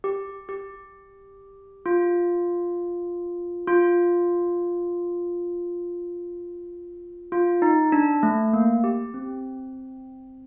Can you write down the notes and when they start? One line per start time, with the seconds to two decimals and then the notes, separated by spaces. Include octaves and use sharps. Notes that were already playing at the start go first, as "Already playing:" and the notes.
0.04 G4
0.49 G4
1.86 F4
3.67 F4
7.32 F4
7.62 D#4
7.92 D4
8.23 A3
8.53 A#3
8.84 G4
9.14 C4